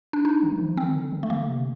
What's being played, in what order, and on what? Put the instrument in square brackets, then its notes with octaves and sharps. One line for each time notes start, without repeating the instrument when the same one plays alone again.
[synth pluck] D4
D#4
[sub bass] D#3
D#3
F3
[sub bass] D#3 [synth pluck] C4
[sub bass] D3
D3
[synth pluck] A3
[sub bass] D3 [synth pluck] A#3
[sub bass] C3